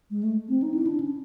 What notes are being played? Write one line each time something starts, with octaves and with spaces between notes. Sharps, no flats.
G#3
A3
C4
D#4
E4
D4
C#4